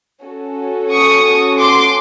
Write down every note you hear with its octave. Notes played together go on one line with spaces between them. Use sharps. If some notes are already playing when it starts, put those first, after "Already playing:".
C#4 F#4 A4
C#6 D#6
C6 D6